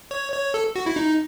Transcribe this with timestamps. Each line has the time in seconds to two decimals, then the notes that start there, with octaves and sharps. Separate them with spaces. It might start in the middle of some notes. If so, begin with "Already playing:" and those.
0.11 C#5
0.33 C#5
0.54 A4
0.76 F#4
0.86 E4
0.96 D#4